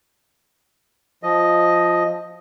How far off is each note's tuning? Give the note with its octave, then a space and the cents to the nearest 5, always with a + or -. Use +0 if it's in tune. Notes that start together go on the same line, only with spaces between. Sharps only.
F3 +0 D#5 +0